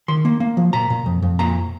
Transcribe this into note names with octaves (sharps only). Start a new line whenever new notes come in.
D#3 C6
A#3
A#3
F3
A#2 A#5
A#2
F2
F2
A#2 A#5